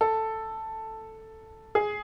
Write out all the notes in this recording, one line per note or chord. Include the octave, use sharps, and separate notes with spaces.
A4
G#4